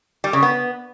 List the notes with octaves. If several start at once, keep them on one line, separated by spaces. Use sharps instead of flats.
G3
C#3
B3